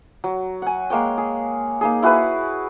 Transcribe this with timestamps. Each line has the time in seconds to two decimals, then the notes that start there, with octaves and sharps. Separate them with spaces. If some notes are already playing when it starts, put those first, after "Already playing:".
0.24 F#3
0.62 F#5 G#5
0.90 G#3 A#3 C#5 G5
1.18 G#4
1.81 A#3 D#4 G#4
2.02 E4 F#4 G#4 B4